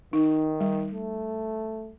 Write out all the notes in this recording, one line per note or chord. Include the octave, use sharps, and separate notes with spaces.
D#3 D#4
G3
A3